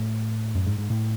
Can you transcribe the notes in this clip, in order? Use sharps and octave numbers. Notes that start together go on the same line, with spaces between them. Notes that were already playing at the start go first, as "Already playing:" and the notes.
Already playing: A2
F#2
G#2
G#2
A2